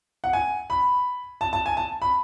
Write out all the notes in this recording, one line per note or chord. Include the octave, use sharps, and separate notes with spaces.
F#5
G#5
B5
A5
A5
G#5
A5
B5